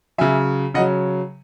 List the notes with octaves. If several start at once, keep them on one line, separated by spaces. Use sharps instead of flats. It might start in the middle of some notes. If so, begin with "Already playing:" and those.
C#3 F#3 E5 G#5
C#3 F#3 D#5 F#5